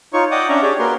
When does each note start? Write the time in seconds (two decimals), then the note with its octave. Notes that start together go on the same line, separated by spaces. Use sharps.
0.13 D#4 F4 C#5 C#6
0.31 D5 D#5 F#5 G5 D6 D#6
0.49 C#4 D4 C#5 E5 A#5
0.63 G4 G#4 C#5 D5
0.79 A#3 F#4 A#4 B4 C6